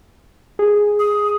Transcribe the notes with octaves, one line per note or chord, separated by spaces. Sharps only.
G#4
D#6